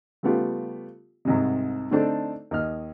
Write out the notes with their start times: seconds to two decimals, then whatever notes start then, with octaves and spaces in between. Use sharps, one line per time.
0.23 C#3 G3 A3 B3 F4 G4
1.25 C2 G#2 C3
1.91 D3 A3 C4 D4 D#4 A4
2.51 D#2 D#5 F6